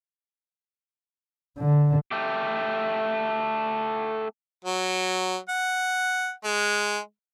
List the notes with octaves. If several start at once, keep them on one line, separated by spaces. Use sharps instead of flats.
D3
A3 G4
F#3
F#5
G#3